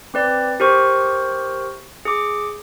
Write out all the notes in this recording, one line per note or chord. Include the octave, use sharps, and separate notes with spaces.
C4 B4 D5
G4 A#4 C5 C#6
G#4 D6